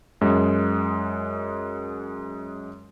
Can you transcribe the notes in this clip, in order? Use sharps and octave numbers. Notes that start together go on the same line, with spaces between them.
F#2 G#3